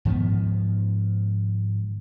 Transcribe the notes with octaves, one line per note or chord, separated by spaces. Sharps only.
G#2 D#3 F3 B3